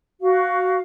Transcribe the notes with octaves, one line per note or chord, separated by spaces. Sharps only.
F#4 F5